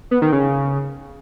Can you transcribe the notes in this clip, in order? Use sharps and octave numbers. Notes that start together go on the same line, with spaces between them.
B3
D#3
C#3